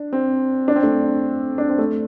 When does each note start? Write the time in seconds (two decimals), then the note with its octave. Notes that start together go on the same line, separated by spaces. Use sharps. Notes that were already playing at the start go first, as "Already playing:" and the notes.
Already playing: D4
0.13 C4
0.68 D4
0.76 C4
0.83 A3 D4
1.58 D4
1.69 C4
1.79 A3